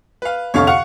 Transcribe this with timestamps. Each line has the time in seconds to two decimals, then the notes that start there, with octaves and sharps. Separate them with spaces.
0.22 B4 F5
0.54 C2 F2 D3 C#5 F5 C#6
0.67 F5 F#5 C#6 C#7 F7